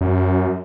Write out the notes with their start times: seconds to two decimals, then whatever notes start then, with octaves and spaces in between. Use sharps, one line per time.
0.01 F#2